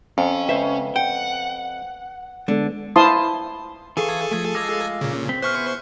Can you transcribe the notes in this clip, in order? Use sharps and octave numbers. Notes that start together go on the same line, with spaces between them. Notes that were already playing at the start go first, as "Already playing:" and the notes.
F2 C#4
C#2 B4 C5 E5
F#5 G5
D3 G#3 B3 A4
E4 C5 F5 A5 C6 D#6
E3 G#4 A4 F5 G#5 C#6
F3 A3
G#3 F4 F5 D6 E6 A#6
A#2 C#3
C4 B6
B3 E4 G#4 C5 C#6 F6 F#6